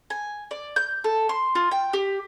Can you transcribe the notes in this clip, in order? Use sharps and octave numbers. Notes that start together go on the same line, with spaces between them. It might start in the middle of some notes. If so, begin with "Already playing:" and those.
G#5
D5
G6
A4
C6
F4
G5
G4